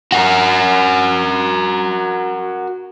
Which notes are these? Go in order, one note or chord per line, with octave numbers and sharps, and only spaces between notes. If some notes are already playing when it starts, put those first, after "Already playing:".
F#4 A#4